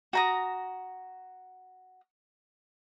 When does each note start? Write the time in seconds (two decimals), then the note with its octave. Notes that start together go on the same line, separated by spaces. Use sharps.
0.13 F#4 A#5 D#6